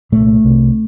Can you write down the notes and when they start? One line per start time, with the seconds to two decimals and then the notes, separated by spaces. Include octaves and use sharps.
0.12 C2 A#2 A3
0.44 C2 C3